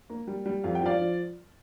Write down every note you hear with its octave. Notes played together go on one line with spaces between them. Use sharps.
A#3
G3
G3
F2 F5
G5
F3 D5 F5
F3